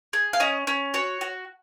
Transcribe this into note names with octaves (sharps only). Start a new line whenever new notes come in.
G#4
F5
C#4 D#5
C#4
F#4 C#5
F#4